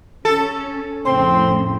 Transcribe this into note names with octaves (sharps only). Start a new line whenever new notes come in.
C#4 A4
F2 A2 C#3 C4 C6